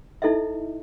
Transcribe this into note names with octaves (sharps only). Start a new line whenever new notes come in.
D#4 E4 A4 D#5 E5